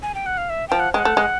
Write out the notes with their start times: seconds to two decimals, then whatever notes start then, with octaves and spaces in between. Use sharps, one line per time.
0.03 G#5
0.15 G5
0.26 F#5
0.38 F5
0.50 E5
0.69 F3 G5
0.80 F#5
0.94 G#3 G5
0.99 F#5
1.05 A3
1.17 G#3